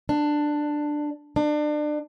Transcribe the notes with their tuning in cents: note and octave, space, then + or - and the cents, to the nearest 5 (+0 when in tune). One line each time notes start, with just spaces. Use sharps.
D4 +10
D4 +30